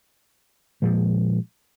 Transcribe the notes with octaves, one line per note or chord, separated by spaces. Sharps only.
A#2 F3 G#3